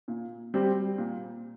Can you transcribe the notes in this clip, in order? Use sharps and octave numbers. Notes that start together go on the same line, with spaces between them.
A#2
G3 C4 G4 C5
A#2